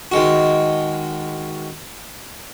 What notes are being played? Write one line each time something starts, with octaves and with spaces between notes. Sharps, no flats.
D#3 G#3 F#4